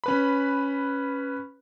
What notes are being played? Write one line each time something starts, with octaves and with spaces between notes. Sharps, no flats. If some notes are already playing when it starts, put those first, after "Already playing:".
C#4 B4 B5